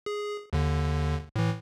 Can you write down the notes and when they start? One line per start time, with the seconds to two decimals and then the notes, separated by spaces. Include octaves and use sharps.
0.06 G#4
0.53 D#2 D3
1.36 A2 E3